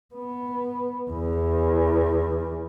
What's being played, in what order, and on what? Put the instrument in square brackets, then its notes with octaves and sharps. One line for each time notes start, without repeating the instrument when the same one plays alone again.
[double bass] B3
E2